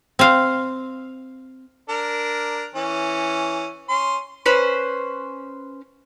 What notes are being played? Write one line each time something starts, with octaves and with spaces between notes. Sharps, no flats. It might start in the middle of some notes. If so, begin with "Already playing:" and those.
C4 F5
D4 A#4
E3 C#4
C#4 C6
C#4 B4 C5